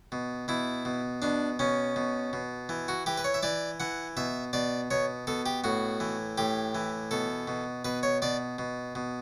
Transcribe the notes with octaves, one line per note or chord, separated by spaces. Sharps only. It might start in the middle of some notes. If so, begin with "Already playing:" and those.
B2
B2 E4
B2
B2 D4
B2 C#4
B2
B2
E3
F#4
E3 G4
B4
C#5
E5
E3 D5
E3 F#5
B2 E5
B2 D5
B2 C#5
B2 A4
G4
A2 F#4
E3
A2 G4
E3
B2 A4
B2
B2 B4
C#5
B2 D5
B2
B2